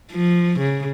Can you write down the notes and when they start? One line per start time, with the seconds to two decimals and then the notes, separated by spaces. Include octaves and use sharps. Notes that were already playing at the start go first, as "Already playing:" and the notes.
0.12 F3
0.60 C#3